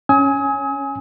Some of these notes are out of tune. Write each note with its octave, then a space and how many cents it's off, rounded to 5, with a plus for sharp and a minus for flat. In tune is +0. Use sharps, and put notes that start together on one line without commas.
C#4 +0 G#5 +0 D#6 +40